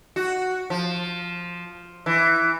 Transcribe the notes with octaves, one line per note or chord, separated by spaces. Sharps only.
F#4
F3
E3